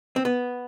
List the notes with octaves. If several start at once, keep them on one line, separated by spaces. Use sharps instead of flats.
C4
B3